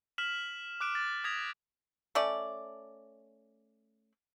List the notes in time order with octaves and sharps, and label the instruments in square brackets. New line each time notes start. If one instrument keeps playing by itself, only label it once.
[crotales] F6 B6 E7 F#7
D6 F#6 D7 E7
A6
D#6 G#6 A#6 B6 F7
[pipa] A3 C#4 D5